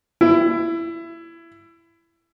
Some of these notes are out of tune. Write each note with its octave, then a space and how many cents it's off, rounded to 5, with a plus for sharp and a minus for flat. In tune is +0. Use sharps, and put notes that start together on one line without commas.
E4 +20